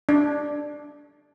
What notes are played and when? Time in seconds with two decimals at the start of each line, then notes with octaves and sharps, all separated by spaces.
0.09 D4